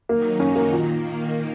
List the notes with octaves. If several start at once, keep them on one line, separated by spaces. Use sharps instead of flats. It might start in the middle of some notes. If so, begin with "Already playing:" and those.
D#3 F#3 A#3 D#4
F#2 D#3 F#3 C#4 D#4
A#3
A#2 D#3 A#3